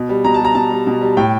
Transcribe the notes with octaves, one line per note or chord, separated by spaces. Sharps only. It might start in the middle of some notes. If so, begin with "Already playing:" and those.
Already playing: B2
G3
B2 A#5
A5
G3 A#5
B2 A5
G3
B2
G3
A2 G5